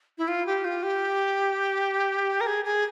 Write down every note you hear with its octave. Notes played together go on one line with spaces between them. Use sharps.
E4
F4
G4
F4
G4
A#4
G#4
G#4